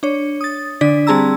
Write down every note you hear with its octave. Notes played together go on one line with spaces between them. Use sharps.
D4 C#5
D#6 A6
D3 D4 D5 B6
G3 C4 G#4 A5 A#5 E6